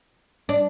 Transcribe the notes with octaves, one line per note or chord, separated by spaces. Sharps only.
D4